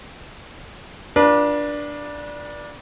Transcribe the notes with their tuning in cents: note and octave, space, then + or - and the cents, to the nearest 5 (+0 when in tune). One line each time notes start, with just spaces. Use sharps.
D4 +0 F4 +0 B4 -40